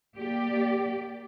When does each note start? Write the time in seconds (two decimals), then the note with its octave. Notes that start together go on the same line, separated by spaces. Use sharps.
0.16 A#3 G4 D5